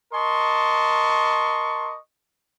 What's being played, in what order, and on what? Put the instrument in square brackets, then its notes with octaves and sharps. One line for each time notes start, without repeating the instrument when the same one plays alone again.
[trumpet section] A#4 D#5 A5 C6 C#6